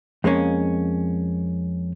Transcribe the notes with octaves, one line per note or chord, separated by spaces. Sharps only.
F2 G#3 A#3 C#4